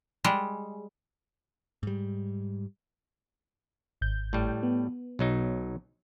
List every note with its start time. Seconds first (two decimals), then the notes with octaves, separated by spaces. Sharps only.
0.24 G3 G#3
1.83 G#2 G3
4.01 G#1 G6
4.33 A2 G3
4.63 B3
5.19 B1 F#3 D#4